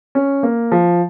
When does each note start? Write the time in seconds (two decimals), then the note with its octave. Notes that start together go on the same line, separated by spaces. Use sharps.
0.15 C#4
0.43 A#3
0.72 F3